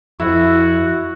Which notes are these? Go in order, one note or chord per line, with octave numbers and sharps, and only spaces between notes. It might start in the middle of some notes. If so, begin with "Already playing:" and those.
F2 E4 F#4